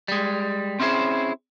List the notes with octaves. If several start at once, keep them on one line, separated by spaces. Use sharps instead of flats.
G3 G#3
C4 C#4 E4 F#4 G#4 C5